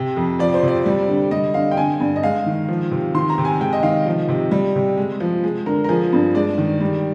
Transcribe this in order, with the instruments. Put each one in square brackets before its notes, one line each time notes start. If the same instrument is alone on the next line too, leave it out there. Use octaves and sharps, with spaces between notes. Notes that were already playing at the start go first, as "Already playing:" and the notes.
Already playing: [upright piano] C3
F2
F3 D5
C5
C3 D5
G3
D3
G3 D#5
D3 F5
G5
D3 G#5
G2
D#5
G#3 F5
D#3
F3
C3
D#3 C6
A#5
C3
G#5
G#3 G5
D#5
D#3 F5
F3 D#5
C3
G3
C3
G#3
F3
G#3
D3 A#4
A#4
F3 G#4
G2
G#3 D5
D#3
G3